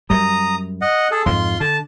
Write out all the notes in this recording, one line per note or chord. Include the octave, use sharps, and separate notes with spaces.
F#2 G3 A#5 D#6
D#5 F#5
G#4 A4
F2 G#2 F4 C6
D3 A5